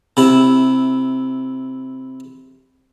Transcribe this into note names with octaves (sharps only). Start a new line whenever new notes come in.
C3 E4